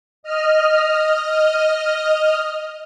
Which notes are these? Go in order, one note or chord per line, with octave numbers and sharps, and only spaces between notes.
D#5 F6